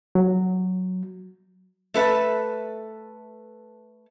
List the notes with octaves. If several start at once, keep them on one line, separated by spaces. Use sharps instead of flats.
F#3
A3 A4 B4 E5